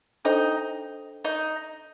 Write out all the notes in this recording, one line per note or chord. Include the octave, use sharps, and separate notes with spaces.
D4 D#4 A4 C5 G5
D#4